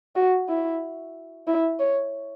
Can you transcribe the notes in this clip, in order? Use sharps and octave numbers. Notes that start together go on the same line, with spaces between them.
F#4
E4
E4
C#5